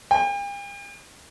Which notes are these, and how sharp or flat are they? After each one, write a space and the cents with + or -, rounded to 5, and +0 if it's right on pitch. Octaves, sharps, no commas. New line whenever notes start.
G5 +45